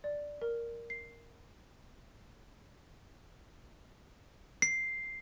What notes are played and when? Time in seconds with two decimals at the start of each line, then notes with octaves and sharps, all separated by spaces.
0.04 D5
0.42 A#4
0.90 C7
4.62 C7